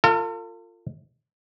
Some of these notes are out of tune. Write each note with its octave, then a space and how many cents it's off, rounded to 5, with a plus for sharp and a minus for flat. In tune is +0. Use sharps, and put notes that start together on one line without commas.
F4 +0 A4 +45